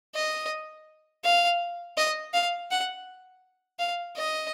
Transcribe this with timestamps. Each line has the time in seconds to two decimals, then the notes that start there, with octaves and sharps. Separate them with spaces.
0.15 D#5
1.25 F5
1.97 D#5
2.33 F5
2.71 F#5
3.79 F5
4.17 D#5